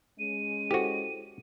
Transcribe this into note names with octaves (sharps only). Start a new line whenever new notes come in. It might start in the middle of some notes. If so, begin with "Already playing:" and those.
G#3 C#4 D#7
E4 F#4 G4 A4 C5